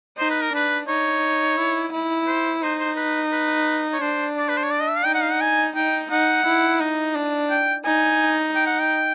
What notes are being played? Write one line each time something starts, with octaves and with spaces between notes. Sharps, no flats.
D#4 C5
B4
A#4
D4 B4
D#4 C#5
E4
E4
C5
D#4 C5
C5
B4
B4
C#5
D4 C5
D5
B4
C5
C#5
D5
D#5
E5
F5
D#4 G5
F#5
F5
F#5
G#5
D#4 G5
D#4 F#5
E4
D#4
D4
G5
D#4 G#5
G5
F#5
G5